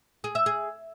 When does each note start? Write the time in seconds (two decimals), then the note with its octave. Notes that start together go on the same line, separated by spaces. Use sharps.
0.24 G#4
0.35 E5
0.46 G#4